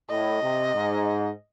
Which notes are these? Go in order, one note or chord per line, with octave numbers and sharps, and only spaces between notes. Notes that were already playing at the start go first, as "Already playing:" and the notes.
A2 D#5
C3
G#2